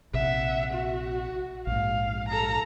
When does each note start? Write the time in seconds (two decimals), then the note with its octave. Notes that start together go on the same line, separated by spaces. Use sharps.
0.14 A#1 C3 E5 F#5
0.74 F#4
1.67 A#1 G#2 F5
2.29 A4 A#5